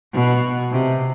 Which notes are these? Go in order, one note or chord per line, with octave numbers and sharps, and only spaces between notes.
B2
C3